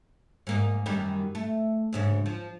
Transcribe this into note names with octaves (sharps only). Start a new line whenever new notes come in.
G#2 A#3 D#4
F#2 D#3 G3
A3
D2 G#2 C#3
F3